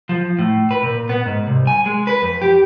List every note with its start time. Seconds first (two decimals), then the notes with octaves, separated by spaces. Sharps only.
0.09 F3
0.39 A2
0.71 B4
0.83 A#2
1.09 B3
1.26 G#2
1.47 C2
1.67 G#5
1.86 G#3
2.07 B4
2.22 F2
2.42 G4